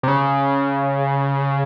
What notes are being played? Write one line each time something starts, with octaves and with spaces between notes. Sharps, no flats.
C3
C#3